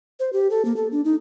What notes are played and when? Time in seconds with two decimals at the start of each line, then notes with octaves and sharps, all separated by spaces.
0.20 C5
0.33 G4
0.51 A4
0.65 A#3
0.76 A4
0.92 D4
1.05 D#4